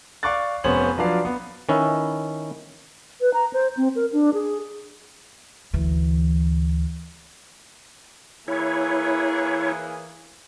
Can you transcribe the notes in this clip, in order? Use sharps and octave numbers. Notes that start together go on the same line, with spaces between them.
D5 F5 C#6 D6 F#6 A6
F1 B3 C#4 C5 C#5 F#7
F3 F#3 D4 B4 D5 F5
B3
D#3 C#4 E4 B4
B4
A#5
C5
C4
A#4
D4
G#4
D2 E3
E3 A#3 E4 G#4 C#5